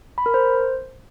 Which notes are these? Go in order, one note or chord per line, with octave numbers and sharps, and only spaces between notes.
B5
A#4
C5